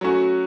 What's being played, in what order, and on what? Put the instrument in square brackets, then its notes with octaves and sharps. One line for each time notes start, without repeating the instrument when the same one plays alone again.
[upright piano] F#3 A3 C#4 F#4